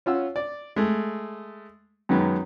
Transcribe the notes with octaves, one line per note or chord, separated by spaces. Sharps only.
C#4 F4 F#5 E6
D5
G#3 A3
F#2 D#3 G#3 B3